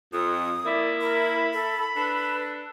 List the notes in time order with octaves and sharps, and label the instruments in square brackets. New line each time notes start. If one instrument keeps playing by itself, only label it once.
[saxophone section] F2 [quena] D#6
[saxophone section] A#3 E4 [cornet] D5
[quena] A#4 [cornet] B5
[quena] A4
[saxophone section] D4 A4 [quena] B4